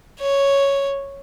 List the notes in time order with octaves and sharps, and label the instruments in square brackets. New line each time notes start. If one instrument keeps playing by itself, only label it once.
[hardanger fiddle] C#5